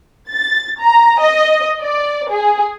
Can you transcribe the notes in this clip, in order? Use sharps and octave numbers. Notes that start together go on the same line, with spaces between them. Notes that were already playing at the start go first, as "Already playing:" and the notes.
A6
A#5
D#5
D5
G#4